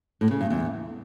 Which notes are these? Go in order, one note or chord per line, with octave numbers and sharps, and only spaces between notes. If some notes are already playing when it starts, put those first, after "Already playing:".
A2
C#3
G2
E2